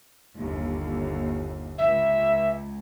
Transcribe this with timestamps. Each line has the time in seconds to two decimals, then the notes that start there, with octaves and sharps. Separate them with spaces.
0.39 G1 D#2
1.78 C#2 E5